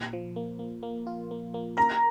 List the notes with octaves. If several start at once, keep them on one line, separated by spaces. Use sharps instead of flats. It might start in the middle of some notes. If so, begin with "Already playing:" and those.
Already playing: A#2
F3
A#3
A#3
A#3
F4
A#3
A#3
A#4 A#5